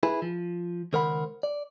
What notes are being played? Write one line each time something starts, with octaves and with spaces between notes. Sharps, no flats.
E4 G#4 B4
F3
C#2 D#3 A#4 C5 F#5 B5
D5